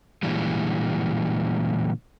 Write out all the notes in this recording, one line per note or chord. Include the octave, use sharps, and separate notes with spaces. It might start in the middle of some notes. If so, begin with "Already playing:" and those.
A#2 D3 E3 G3 G#3